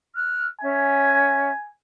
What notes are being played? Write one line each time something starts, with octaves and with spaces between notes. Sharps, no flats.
F6 F#6
C#4 E5 G#5